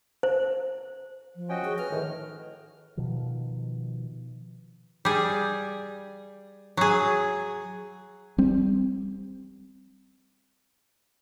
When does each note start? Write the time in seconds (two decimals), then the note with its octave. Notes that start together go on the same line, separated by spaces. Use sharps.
0.23 C5
1.36 F3
1.49 C#4 F#4 D#5 G5
1.65 G#4
1.79 B4 F6
1.92 A2 D#3
2.97 B2 D#3 F3
5.05 G3 G#4
6.77 F#3 G#4
8.38 G3 C4